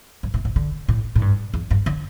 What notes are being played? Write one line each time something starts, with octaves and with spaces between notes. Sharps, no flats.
G2
A2
A2
D3
A2
A2
G2
E2
G2
D3